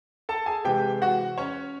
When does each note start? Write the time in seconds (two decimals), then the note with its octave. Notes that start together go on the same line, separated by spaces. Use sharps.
0.29 A4 A5
0.46 G#4 G#5
0.65 C3 E3 G#3 G4 G5
1.02 F#4 F#5
1.38 C#4 C#5